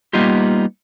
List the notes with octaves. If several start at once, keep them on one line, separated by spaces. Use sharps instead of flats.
G3 A#3 B3 D#4 F4 G4